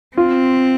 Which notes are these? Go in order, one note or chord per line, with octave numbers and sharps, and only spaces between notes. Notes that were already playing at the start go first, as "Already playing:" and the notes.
C4 F4